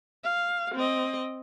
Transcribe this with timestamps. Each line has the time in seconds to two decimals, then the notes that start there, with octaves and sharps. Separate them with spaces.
0.24 F5
0.75 C4 D#5